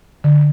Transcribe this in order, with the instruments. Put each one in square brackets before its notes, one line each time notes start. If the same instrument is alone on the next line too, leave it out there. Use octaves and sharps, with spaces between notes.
[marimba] D3